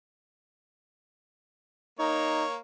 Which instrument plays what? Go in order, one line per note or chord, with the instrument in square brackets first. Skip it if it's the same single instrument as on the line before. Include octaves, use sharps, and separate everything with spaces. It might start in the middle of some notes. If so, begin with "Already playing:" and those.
[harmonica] A#3 C#5 [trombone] D#4